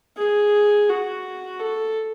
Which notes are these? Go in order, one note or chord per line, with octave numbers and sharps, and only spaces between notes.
G#4
F#4
A4